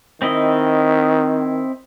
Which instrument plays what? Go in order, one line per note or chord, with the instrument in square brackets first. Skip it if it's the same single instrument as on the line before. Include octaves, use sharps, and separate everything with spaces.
[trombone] D#3 [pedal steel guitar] C4 E4 D#5